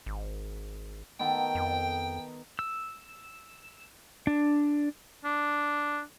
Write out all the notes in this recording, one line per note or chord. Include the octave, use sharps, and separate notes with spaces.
G#1
D#3 B3 A4 G5
F2
E6
D4
D4